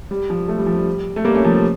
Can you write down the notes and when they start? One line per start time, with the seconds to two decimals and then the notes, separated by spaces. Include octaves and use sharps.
0.11 G3
0.30 F3
0.48 A3
0.58 G3
0.66 F3
0.76 G3
1.16 A3
1.25 G3 A#3
1.34 A3 C#4
1.45 F3 A3
1.54 G3